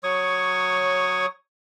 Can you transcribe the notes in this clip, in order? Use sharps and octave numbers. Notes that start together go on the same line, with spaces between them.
F#3 C#5 C#6 D#6